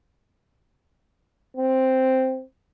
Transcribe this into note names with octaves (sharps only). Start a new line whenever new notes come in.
C4